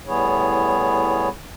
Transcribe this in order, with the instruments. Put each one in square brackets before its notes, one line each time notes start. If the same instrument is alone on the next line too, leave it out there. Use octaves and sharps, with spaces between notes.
[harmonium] A2 G3 B3 E4 G#4 C#5